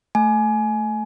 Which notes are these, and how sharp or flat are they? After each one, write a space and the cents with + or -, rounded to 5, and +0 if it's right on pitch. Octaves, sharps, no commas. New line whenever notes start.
A3 +0 G#5 +25